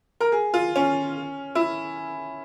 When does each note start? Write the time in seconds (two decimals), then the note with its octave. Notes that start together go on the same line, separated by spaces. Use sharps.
0.20 A#4
0.32 G#4
0.54 F4
0.76 C#4
1.55 E4